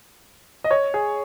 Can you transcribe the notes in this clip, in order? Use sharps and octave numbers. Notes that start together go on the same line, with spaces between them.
D#5
C#5
G#4